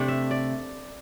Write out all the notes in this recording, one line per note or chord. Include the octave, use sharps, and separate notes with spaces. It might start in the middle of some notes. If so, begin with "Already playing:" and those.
Already playing: C3 A3 D4
E5
D5